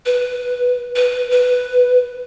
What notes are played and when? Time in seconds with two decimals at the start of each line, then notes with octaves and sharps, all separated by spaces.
0.06 B4
0.96 B4
1.31 B4